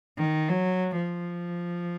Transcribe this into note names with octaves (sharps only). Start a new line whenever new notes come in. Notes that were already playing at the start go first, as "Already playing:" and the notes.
D#3
F#3
F3